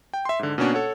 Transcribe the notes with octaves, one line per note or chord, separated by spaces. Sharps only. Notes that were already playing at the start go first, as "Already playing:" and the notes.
G5
E5 C6
G#2 D3
B2 A#3 C#4 D4 F#4
A4 C#5 F#5